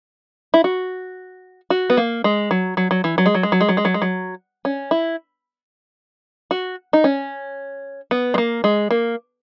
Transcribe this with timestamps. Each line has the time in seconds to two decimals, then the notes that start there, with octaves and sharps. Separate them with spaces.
0.54 E4
0.64 F#4
1.70 F#4
1.90 B3
1.97 A#3
2.24 G#3
2.51 F#3
2.77 F#3
2.91 F#3
3.04 E3
3.18 F#3
3.26 G#3
3.35 F#3
3.43 G#3
3.52 F#3
3.61 G#3
3.69 F#3
3.77 G#3
3.85 F#3
3.94 G#3
4.02 F#3
4.65 C#4
4.91 E4
6.51 F#4
6.93 D#4
7.04 C#4
8.11 B3
8.34 G#3
8.38 A#3
8.64 G#3
8.91 A#3